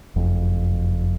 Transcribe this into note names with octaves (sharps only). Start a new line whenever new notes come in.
F#1 F2